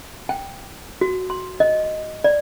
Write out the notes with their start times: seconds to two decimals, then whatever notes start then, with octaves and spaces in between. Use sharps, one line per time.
0.29 G5
1.01 F#4
1.30 C6
1.60 D#5
2.24 D5